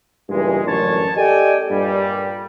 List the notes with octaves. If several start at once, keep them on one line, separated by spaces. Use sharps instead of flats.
C#2 G2 A#2 E3 G#3
A1 F#2 D3 A#4 C#5 A5
G4 A4 D5 D#5 G5 G#5
G2 A#2 G3